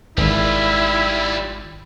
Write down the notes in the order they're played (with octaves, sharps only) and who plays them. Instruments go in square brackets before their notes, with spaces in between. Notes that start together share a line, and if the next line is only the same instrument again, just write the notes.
[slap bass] G#1 [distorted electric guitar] G3 F4 [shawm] E4